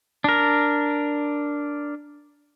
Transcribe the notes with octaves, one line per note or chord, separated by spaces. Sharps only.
D4 A#4